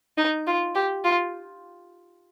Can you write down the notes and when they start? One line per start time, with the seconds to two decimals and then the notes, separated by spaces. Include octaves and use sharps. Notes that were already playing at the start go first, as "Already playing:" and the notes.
0.18 D#4
0.47 F4
0.75 G4
1.04 F4